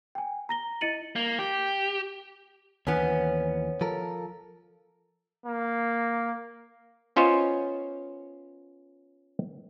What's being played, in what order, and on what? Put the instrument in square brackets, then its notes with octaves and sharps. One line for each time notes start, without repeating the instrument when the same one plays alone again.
[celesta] G5 G#5
A#5 A#6 G7
E4 D#5 A6 C#7 D#7 F#7
[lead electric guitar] A#3
G4
[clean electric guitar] D#2 E3 [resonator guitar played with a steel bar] B3 C#4
[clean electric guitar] F3 A4 A#4
[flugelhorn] A#3
[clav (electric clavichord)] B3 C#4 F4 C5 C#5 D#5